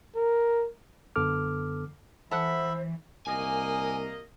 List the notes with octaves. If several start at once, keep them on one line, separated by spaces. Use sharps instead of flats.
A#4
F#2 D3 B3 A4 D6 F6
E3 A4 C5 E5 F#5 B5
C2 A#3 D#5 G#5